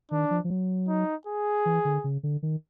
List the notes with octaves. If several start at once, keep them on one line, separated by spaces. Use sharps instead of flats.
D#3 D4
F3
F3
F#3
D#4
G#4
E3
D3
C#3
D3
D#3